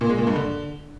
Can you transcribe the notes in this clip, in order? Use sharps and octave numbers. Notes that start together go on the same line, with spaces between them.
A#2
G#3
A#2
G2
D3